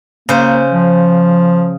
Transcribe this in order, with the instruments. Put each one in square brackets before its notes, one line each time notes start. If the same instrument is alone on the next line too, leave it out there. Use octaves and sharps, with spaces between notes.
[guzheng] C#3 C5 [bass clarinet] A#3
[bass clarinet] F3